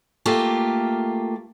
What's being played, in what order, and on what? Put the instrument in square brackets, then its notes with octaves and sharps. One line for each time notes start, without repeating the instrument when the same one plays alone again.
[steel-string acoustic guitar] A3 A#3 F4 G4